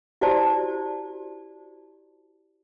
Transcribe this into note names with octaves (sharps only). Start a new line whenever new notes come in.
E4 F#4 G4 C5 D5 A5